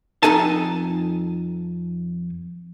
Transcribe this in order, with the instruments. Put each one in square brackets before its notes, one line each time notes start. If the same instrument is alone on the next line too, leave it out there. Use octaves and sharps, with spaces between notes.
[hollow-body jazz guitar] F2 G#3 D#4 A4 G#5 A5